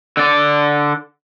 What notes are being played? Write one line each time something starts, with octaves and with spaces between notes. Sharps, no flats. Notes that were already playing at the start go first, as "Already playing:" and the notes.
D3 D5